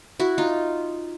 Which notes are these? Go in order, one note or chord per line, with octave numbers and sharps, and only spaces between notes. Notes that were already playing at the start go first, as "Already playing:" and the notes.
E4 F#4
D#4 F4